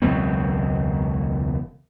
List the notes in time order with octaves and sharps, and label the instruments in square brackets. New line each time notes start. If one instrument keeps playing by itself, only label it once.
[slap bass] E1 C#2 F#3 C4